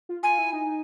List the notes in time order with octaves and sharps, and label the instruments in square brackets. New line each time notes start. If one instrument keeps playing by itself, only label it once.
[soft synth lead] F4
[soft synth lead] F4 [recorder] G#5
[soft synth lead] E4
D#4